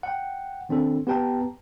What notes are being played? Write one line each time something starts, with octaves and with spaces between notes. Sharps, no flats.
F#5 G5
D#3 C4 D4 A4
B3 G4 B4 G5 A5 A#5